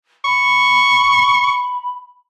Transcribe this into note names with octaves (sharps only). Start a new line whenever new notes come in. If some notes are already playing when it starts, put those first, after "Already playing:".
B5 C#6